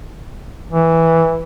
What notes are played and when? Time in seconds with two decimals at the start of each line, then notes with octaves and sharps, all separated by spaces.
0.71 E3